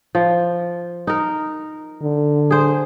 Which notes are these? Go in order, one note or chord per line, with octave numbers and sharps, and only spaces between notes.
F3
D#4 A#4
D3
G#4 C5